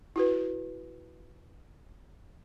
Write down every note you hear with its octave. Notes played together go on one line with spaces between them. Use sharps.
E4 F#4 B4